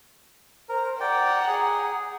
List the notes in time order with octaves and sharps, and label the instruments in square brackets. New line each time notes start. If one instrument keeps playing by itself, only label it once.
[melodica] A#4 [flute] C5
[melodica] D5 G5 [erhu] F#5 [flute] A#5
[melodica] G#4